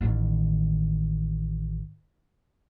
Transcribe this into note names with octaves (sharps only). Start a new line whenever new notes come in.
A1 D#3